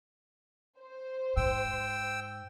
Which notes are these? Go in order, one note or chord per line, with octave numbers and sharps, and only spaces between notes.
C5
G#2 G5 E6